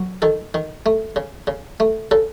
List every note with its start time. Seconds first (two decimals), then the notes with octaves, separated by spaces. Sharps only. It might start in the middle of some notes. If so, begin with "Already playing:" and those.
Already playing: F#3
0.22 D#3 A4
0.54 D#3
0.86 A3
1.16 C#3
1.47 C#3
1.80 A3
2.11 C#3 A4